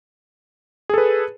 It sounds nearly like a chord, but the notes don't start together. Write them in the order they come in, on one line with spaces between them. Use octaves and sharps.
G#4 A4 B4